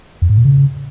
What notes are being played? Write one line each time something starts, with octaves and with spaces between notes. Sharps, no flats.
F2
G#2
A#2
C#3